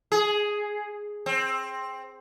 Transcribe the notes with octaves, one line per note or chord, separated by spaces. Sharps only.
G#4
C4